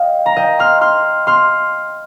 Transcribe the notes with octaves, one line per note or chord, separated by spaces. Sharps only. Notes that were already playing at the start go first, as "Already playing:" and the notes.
Already playing: D#5 F5 G5
A#5
D#5 G5
C6 F6
C6 F6
C6 F6